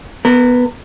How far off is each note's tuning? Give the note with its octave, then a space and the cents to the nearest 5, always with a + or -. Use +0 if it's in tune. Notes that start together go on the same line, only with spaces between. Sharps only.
B3 +0 A#4 -30